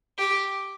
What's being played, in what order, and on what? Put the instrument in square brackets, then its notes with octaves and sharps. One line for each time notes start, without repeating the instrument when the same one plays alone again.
[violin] G4